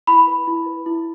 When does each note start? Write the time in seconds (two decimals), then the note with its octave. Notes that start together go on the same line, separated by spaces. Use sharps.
0.07 E4 B5
0.27 B4
0.47 E4
0.66 B4
0.86 E4